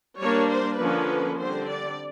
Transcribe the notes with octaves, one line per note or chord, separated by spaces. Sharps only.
G3 A#3 D4 C#5
C5
D3 F3 A#3 C#4 B4
D3 G3 C4 C5
D5